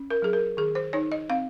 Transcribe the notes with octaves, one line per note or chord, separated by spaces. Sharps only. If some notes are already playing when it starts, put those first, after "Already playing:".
Already playing: C#4
A#4
F#3 G#4
A#4
D#3 G#4
C5
D#4 C#5
D#5
C4 F5